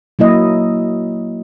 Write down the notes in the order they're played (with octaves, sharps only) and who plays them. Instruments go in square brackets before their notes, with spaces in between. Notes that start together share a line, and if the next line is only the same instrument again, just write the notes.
[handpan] F#3 A#3 E4 D#5